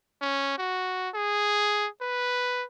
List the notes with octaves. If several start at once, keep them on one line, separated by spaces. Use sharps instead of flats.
C#4
F#4
G#4
B4